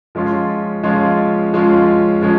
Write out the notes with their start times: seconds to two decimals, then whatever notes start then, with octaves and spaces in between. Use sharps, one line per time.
0.15 F3 G#3 C#4 F4
0.83 F3 G#3 C#4 F4
1.52 F3 G#3 C#4 F4
2.22 F3 G#3 C#4